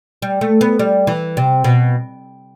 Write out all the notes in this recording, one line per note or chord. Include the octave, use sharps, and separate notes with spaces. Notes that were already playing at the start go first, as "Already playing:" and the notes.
G3
A3
B3
G3
E3
C3
B2